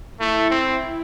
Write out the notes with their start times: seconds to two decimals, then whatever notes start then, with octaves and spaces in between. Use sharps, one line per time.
0.20 A3 E4
0.50 C4